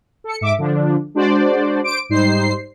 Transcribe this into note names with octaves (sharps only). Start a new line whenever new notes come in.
A4 C#7
G#2 E5 D6
D3 F3 D4
G#3 D4 F#4 C5 D5
C5 D6 D7
G#2 G3 D#4 C5 C7